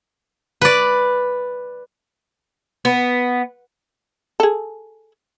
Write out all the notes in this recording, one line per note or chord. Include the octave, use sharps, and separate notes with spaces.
B4 D5
B3
G#4 A4